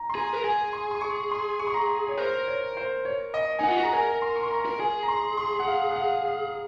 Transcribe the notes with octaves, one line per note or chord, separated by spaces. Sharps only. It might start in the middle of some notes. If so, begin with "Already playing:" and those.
Already playing: A#5
C6
G#4 A#5
A#4
G#4 G#5
C6
C6
C#6
C6
C#6
C6
A#5
C#5
A#4 C5
C#5
C5
C#5
D#5
D#4 F#5 G#5
F4
F#4
G#4 A#5
A#4 G#5
C6
C#6
C6
A#5
A#4
G#4 G#5
A#5
C6
C6
F#5
F5
F#5
F5
F5